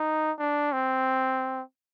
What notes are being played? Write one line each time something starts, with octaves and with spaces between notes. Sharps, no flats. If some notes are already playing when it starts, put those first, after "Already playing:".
Already playing: D#4
D4
C4